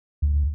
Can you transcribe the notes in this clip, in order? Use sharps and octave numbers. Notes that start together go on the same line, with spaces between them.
D2